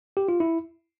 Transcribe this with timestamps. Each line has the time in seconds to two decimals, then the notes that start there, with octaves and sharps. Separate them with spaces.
0.17 G4
0.28 F4
0.40 E4